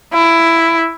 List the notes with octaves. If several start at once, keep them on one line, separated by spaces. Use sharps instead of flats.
E4